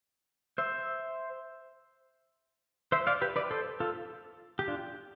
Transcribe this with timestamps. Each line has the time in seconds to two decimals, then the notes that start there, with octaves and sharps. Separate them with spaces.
0.58 C5 E5
2.92 C5 E5
3.07 D5 F5
3.22 G4 B4
3.36 B4 D5
3.51 A4 C5
3.80 F4 A4
4.59 G4
4.68 D4 F4